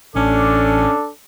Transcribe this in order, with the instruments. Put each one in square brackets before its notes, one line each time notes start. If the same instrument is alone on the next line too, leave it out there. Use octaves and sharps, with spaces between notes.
[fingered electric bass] A1 [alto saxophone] C#4 [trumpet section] D4 A4 D6